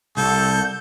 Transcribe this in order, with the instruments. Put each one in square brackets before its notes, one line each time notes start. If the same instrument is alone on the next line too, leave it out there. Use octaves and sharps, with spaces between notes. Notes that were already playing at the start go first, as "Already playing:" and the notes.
[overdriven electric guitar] C2 [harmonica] A4 [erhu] G6